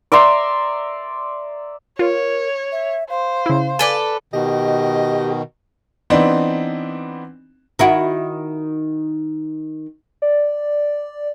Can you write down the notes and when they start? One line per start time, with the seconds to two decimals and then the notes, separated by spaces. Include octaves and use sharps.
0.12 D5 E5 A#5 C6
1.99 F4 A#4 C#5
2.72 E5
3.10 C5 F5
3.46 C#3 E4
3.79 A4 B4 D5 G#5
4.33 B2 D#3 G4 D#5
6.10 E3 B3 C4 D4 D#4
7.79 D#3 E4 F#4
10.22 D5